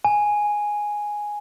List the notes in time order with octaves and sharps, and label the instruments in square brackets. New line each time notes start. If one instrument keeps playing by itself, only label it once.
[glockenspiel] G#5